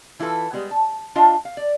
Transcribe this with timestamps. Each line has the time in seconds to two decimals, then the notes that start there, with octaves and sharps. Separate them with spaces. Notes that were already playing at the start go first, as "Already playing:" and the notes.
0.19 E3 E4 F4 A4 B4
0.53 G3 G#3 B3
0.71 A5
1.15 D4 F4 D#5 F5 A5
1.45 F5
1.57 D5